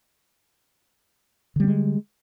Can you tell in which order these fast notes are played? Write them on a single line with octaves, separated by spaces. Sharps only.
D3 G3 B3 G#3